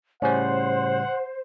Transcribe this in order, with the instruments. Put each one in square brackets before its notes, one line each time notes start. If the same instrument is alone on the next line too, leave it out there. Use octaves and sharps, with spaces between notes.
[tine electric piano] A2 C#3 G3 [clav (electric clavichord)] C#4 [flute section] C5 [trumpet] F#5